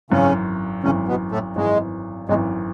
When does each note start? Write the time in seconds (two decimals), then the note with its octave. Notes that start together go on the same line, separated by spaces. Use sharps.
0.10 G#1 F#2 C#3 E3 C#4
0.83 G#1 F#2 C#3 E3 C#4
1.08 B2 B3
1.31 A2 A3
1.56 G#1 F#2 E3 G#3
2.29 G#1 F#2 E3 G#3